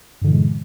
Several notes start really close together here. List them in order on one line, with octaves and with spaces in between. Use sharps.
G2 D3 E3 A#2 G#3